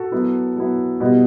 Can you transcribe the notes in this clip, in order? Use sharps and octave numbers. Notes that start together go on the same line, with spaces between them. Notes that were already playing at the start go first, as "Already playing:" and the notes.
Already playing: F#4 A4
F#3 B3 E4
F#3 B3 E4
B2 G3 B3 E4